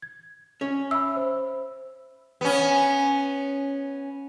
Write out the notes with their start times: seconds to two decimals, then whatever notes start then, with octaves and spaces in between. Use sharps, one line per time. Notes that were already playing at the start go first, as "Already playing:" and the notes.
0.02 G#6
0.61 C#4 C#5
0.91 E5 B5 E6
1.16 C5
2.41 B3 C#4